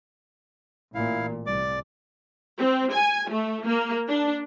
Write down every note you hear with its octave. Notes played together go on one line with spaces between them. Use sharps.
A1 A#2 E4 F5
C2 D5 D6
C4
G#5
A3
A#3
D4